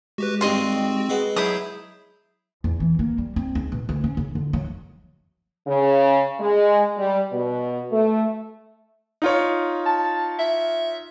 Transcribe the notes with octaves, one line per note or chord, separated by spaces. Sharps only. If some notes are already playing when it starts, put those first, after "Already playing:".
G#3 F#4 G4 B4
G2 D#3 G3 C4 F#4 D#5 C6
G#3 B3
F#3 E4 G#4 D#6 G6
E2
E3
A#3
G3
C4
C#2
B2
D2
C#4
C#3
D3
F#3
C#3
G#3
G3
B2
A3
D#4 F4 C#5
A5
E5